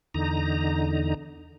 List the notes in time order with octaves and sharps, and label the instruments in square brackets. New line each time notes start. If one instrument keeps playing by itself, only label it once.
[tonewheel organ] E2 D3 D#4 A#5